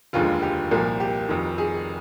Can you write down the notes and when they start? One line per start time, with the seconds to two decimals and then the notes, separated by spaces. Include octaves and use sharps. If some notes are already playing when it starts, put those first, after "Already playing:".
0.13 F1 D#2 D3 F3 G#3 F4
0.42 G4
0.71 C2 A#2 F3 A#3
1.00 G4
1.29 F1 F2 D#3
1.58 G#4